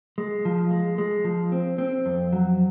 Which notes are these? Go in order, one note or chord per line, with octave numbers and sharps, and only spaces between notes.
G#3
F3
G#3
G#3
F3
C4
C4
F2
F#3